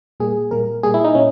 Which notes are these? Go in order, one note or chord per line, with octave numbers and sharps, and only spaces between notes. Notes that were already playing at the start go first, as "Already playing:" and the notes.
A#2 G3 A#3 G#4
A#2 G3 A#3 A#4
A#2 G3 A#3 G#4
E4
D#4
A#2 C#4